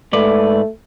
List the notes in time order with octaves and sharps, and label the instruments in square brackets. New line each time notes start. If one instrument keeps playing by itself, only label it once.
[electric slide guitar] G#2 B4 D5 [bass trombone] A3